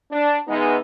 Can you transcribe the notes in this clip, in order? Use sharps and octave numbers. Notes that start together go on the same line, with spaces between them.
D4
E3 G#3 B3 D#4